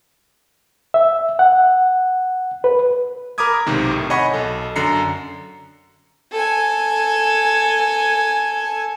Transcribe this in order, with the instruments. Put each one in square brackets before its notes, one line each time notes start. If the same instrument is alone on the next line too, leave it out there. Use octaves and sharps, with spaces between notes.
[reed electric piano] E5
F#5
B4
[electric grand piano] A#4 A#5 B5 D6 D#6 G#6
B1 G#2 C3 D#3
A2
C#5 D#5 F#5 G#5 B5 C#6
B1 A4 D#5
F#2 D3 A#5 C7 C#7
[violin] A4 G#5